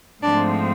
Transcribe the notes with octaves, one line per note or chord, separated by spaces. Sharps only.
G#2 F3 A3 C4 D4